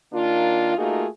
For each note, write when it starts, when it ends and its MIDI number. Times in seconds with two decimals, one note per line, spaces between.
0.13 0.74 51
0.13 0.74 58
0.13 0.74 62
0.13 0.74 65
0.76 1.06 57
0.76 1.06 58
0.76 1.06 63
0.76 1.06 65
0.76 1.06 66
0.76 1.06 68